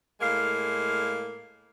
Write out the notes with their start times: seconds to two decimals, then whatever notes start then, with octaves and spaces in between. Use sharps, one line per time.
0.20 A2 G#3 A#3 F5